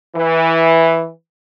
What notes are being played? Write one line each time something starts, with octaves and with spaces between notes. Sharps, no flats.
E3